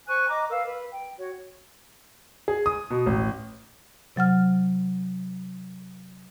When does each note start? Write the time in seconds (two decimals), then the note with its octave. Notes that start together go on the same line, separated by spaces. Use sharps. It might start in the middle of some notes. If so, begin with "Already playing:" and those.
0.07 C5 G#5 C#6 F#6
0.29 D#5 A#5 D6
0.50 A#4 B4 F5 E6
0.64 B4
0.93 G5
1.18 F#4 C#5
2.48 G#4
2.66 D#6
2.90 B2
3.06 A1
4.16 C3 F#3 F#5 F6